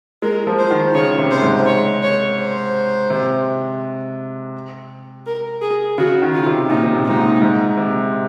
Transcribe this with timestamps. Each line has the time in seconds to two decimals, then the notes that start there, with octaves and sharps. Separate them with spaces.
0.22 G#3 A#4
0.47 F3
0.59 C5
0.70 D#3
0.95 C#3 C#5
1.19 C3
1.31 C5
1.42 G#2
1.66 C#5
2.03 C#5
2.39 C5
3.10 C3
5.26 A#4
5.61 G#4
5.98 C#3 F#4
6.22 D#3
6.34 F4
6.46 C3
6.69 A#2 D#4
6.83 C3
6.94 A#2
7.05 G#2 D#4
7.18 A#2
7.42 G#2
7.77 C3